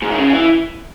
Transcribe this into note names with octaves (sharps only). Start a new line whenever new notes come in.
G#2
D#3
C#3
E3